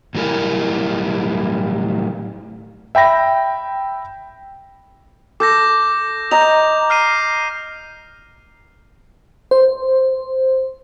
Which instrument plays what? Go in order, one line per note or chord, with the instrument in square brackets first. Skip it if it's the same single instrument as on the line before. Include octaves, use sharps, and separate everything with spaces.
[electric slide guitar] A2 F#3 G3 E4 A#4 G#5
[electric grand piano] E5 G5 B5 A#6
[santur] A4 [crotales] D6 G6 A#6
[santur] D#5 A#5 [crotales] G6 A#6 F7
[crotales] F6 C7 D#7
[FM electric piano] C5